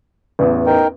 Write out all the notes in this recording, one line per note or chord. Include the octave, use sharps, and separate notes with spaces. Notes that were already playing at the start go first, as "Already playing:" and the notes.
A1 E2
D#4 A#4 G5